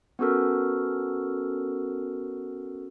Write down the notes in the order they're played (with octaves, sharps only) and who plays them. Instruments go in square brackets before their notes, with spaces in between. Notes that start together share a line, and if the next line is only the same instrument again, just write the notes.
[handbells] B3 C#4 F#4 A4 A#4